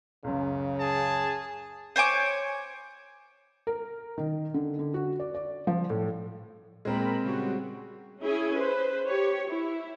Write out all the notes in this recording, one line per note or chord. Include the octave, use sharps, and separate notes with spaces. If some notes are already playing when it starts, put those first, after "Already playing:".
C#2 F#2 C#3
G#4 A5
C5 C#5 G#5 D6
A#4
D#3
D3
D3
F#4
D5
D5
F3
A2
A#2 G#3 C4 A#4 B5
C#3 G3 F#4
C#4 E4 G#4 G#5
B4 C5
G4 C#5
E4